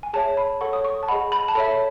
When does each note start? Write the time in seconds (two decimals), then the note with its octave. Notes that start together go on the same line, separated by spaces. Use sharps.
0.03 G#5
0.13 G#4 C#5 E5 A5
0.37 B5
0.61 A4 C#5 F#5 C#6
0.73 D#6
0.84 C#6
1.03 A5
1.08 G#4 D#5 F#5 B5
1.32 B5
1.48 A5
1.55 A4 C#5 E5 B5